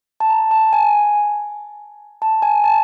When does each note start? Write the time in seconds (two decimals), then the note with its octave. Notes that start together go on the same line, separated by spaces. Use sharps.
0.20 A5
0.30 A#5
0.51 A5
0.73 G#5
2.22 A5
2.42 G#5
2.64 A5